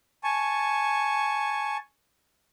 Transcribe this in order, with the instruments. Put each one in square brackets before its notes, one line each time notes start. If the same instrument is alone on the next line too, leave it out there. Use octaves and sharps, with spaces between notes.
[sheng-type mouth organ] G#5 A5 C#6